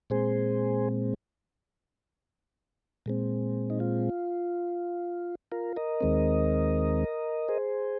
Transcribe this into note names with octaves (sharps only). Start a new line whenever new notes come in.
A#2 G#3 C4 G#4 C5
A#2 G#3 C4
D#4
F4
F4 A#4
A#4 D#5
D#2 D#3 G#3 C4
G#4 C5